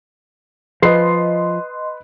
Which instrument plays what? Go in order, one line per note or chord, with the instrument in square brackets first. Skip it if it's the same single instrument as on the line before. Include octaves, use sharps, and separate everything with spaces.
[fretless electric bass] F3 [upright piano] B4 C7 [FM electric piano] D#5 C6